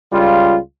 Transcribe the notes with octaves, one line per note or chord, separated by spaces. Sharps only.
C#2 G3 F4